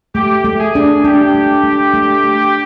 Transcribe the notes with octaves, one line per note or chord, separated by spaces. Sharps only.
A3 G4
A3
G#4
D4
D4 G4
A3
A3
A3
A3